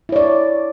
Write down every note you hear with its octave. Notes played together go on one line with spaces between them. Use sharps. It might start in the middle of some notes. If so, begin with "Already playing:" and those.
E4 C#5 D5